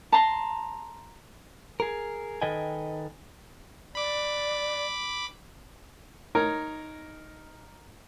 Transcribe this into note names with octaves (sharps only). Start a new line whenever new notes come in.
A5 A#5 C6
G#4 A#4
D#3 A4 B4 D#5 G5 G#5
D5 B5 D6
D#4 A#4 C#5